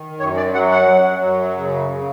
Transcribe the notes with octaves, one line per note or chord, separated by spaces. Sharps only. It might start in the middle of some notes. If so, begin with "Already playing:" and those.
Already playing: D#3
F#2 C#5
D5
F#3 F#5
F#5
F#3
F#2
C#3
C#3